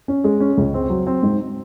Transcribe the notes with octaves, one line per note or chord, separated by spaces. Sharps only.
C#4
G#3
C#4
C#2
C4
F#3
C4
G#2